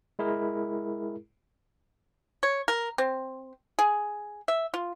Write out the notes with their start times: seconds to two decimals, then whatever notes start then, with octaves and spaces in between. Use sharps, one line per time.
0.19 G#3 E4 G#4 A#4
2.43 C#5
2.68 A#4
2.98 C4
3.79 G#4
4.48 E5
4.74 F4